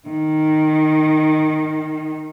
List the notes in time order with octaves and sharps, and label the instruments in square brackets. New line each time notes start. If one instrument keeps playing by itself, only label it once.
[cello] D#3